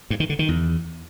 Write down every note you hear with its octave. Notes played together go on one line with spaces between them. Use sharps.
G2
D#3
D3
D#3
E2